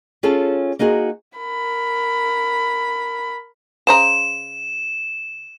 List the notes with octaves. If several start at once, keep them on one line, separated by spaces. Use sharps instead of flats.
C#4 F4 G#4 A4 C#5 A5
A#3 D#4 F#4 G#4
A#4 B5
C#3 C5 A#5 E7